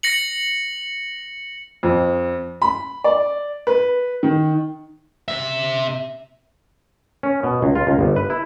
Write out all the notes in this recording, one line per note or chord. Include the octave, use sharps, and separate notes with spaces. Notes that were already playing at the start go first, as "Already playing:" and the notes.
A#6 C#7 F#7
F2
B5
D5
B4
D#3
C3 E5
C#4
B2
C#2
F4
C#2
G1
B4
E4